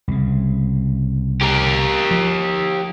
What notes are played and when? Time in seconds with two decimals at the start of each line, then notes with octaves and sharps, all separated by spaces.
0.08 C2 C#3
1.42 G4 A#4
2.11 F3